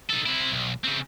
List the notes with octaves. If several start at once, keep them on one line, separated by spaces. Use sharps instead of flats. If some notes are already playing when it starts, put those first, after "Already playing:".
D#4 A4
C3 E4
B1
C#3 C4